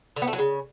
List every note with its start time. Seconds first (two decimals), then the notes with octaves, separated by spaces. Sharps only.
0.16 D3
0.22 B3
0.27 A3
0.33 F#3
0.38 C#3